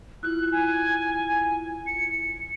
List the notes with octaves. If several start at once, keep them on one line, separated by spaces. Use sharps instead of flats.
E4 F4 F#6
G#5
C#7